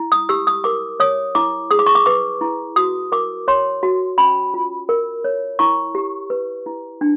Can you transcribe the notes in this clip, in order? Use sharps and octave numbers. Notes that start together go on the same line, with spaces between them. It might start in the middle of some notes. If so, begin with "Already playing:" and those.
Already playing: E4
D#6
G4 E6
D#6
A#4 D6
C#5 D#6
E4 D6
G#4 D#6
D6
C#6
D6
B4 D6
E4
F#4 D#6
A#4 D6
C#5 C6
F#4
C#4 B5
F4
A#4
C#5
E4 C#6
G4
B4
E4
D4